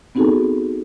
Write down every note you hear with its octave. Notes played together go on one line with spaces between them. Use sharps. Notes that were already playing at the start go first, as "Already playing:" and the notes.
B3 C4 D#4 F#4 G#4 A4